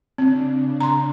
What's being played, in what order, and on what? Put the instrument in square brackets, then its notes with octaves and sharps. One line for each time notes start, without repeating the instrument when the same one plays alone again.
[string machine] C#3 D4 [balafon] C4
[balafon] A#5 C6